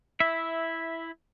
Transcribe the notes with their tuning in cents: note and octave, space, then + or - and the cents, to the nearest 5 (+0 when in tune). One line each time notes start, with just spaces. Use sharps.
E4 +0 E5 -10